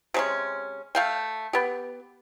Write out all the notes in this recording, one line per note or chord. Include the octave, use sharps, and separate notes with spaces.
C3 G#3 C#4
A3 F5 G5
B3 G4